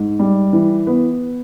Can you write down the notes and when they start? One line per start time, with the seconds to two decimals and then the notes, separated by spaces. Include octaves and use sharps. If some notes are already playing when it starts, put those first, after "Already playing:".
Already playing: G#2
0.19 G3
0.53 E3
0.87 B3